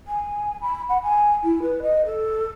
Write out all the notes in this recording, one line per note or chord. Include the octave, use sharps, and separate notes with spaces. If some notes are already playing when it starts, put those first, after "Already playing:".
G#5
B5
F#5
G#5
E4
B4
D#5
A4